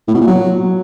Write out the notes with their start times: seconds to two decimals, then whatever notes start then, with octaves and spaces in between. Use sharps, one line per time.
0.08 A2
0.14 B2
0.21 A#2
0.27 F#3